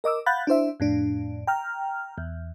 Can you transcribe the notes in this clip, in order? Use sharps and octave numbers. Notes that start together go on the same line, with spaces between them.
A#4 D#5 D6 E6
F5 F#5 B5 F#6 G6 A6
D4 E4 C5 E5
F2 A2 D4
G5 A#5 F6
E2